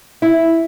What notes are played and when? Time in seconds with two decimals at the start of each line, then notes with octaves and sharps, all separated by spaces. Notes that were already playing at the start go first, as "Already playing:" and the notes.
0.22 E4